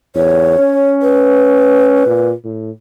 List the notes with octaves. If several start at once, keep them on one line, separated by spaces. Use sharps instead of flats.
E2 C#5
C#4
B4
A#2
A2